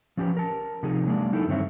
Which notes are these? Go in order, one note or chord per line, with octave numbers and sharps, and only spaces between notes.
F3 C#4 G4 A4 B4
A#4 A5
C3 F3 D#4 G#4
F#3 G#3 A#3 D4
F#3 D#4 E4 A4 A#4
G2 D3 D#3 C4 C#5 E5